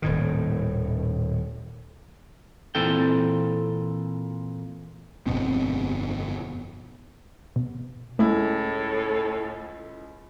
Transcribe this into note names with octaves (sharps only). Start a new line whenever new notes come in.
D#1 A2 D#3
A#2 E3 C4 A4 G5
G1 F2 B2 C4
B2
C#2 A2 A3 E4